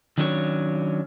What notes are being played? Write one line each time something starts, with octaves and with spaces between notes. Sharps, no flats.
D#3 F#3 C#4 D4 G4 C#5